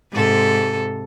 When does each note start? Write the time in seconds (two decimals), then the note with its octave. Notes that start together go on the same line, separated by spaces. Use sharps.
0.12 G#2 C3 A4